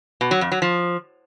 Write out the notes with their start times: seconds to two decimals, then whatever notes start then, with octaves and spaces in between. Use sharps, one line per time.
0.21 B2
0.31 F#3
0.41 F2
0.52 F#3
0.62 F3